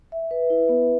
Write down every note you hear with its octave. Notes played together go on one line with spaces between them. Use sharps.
E5
B4
E4
B3